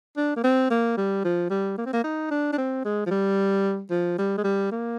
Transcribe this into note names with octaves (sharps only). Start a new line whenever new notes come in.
D4
A#3
C4
A#3
G3
F3
G3
A#3
C4
A#3
D#4
D4
D4
C4
G#3
F3
G3
F3
G3
G#3
G3
A#3